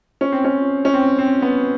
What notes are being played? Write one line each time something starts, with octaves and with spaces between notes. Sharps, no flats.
C#4
C4
C#4
C#4
C4
C4
B3